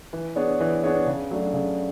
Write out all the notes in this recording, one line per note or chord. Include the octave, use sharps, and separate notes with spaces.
E3
B3 D4 G#4 C#5
E3
B3 D4 G#4 C#5
C#3
F#3 A3 D4
C#3